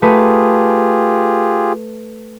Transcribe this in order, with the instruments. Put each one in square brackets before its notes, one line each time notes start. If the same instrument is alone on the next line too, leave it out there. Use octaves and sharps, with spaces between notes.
[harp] A3 B4 D#6 [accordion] F4 G4 G#4